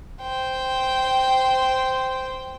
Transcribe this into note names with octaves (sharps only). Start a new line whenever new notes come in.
C5 G5